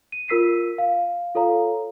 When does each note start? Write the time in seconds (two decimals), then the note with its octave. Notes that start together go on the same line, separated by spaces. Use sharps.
0.12 D#7
0.28 F4 A#4 E6 B6 C7 D#7
0.78 F5
1.35 F4 A4 C#5 F5 A#5